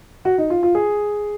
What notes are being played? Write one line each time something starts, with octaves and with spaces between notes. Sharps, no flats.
F#4
D#4
F4
F4
G#4